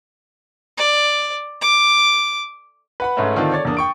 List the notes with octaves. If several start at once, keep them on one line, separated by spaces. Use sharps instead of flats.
D5
D6
B4 F#5 B5
G#2 A3 C#4 B4 E5
D3 D#3 C4 D4 F4 A4
A4 C#5 D5 A6
E2 A#3 D4 D#6
G5 C#6 D7